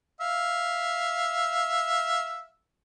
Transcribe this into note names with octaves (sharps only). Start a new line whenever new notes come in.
E5 F5